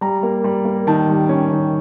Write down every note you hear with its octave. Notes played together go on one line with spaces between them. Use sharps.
G3 A#5
A#3
G3
A#3
D#3 A5
G3
C#4
D#3